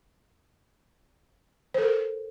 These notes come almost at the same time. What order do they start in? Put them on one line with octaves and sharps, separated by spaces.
C5 A4 A#4